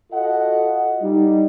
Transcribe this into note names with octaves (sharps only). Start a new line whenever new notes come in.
F4 F#4 A4 D#5 F#5
G3 D#4